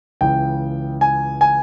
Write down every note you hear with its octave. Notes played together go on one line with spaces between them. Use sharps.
C#2 C#3 E3 G5
G#5
G#5